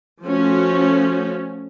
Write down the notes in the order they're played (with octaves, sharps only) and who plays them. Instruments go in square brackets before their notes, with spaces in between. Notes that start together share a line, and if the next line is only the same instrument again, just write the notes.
[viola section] F3 A3 C#4 F#4